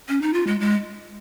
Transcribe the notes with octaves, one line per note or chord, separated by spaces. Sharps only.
C#4
D#4
F4
G#3
G#3